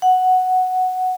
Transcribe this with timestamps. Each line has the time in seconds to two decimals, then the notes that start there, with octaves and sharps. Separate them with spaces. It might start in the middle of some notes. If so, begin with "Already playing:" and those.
0.02 F#5